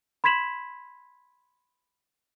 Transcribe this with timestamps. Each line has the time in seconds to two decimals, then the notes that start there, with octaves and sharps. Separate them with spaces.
0.24 B5 C6 G#6 B6 E7 F#7